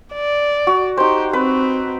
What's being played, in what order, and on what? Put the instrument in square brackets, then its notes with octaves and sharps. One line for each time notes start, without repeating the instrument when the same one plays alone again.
[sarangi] D5
[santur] F#4
[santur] D#4 C5 [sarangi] G4
[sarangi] C4 [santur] B4